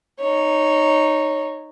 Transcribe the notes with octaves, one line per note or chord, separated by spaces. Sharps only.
D#4 C#5